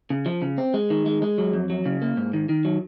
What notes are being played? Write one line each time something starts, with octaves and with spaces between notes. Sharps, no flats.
C#3
F3
C#3
C4
G#3
D#3
G#3
G#3
F#3
F2
F#3
C#3
A#3
G#2
D#3
D#3
F#3